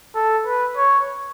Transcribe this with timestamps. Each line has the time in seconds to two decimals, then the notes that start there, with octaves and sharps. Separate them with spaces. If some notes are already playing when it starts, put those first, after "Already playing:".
0.15 A4
0.46 B4
0.77 C#5